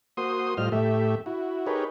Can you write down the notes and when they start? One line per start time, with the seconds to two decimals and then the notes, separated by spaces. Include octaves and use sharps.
0.17 A#3 F#4 C5 C6 D#6
0.57 A2 G3 F4 C5 D#5 F6
0.72 A2 A3 G4 E5
1.26 E4 F#4
1.67 D#4 G4 G#4 A#4 B4 C#5